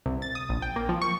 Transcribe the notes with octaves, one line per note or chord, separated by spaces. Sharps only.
C2
A6
D#6
A#1
G5
A#3
F3
C#6